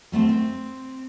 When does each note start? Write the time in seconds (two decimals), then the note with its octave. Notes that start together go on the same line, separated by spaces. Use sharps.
0.12 G3 A3 A#3 C4
0.29 C4